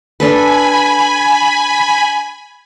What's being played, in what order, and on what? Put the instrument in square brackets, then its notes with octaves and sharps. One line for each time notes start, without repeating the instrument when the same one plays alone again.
[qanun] D4 A4 B4 [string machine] G#5 B5